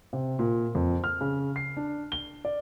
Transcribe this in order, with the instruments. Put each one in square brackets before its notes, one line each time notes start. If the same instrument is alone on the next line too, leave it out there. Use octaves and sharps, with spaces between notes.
[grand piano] C3
A#2
F2
F6
C#3
C7
D4
G7
D5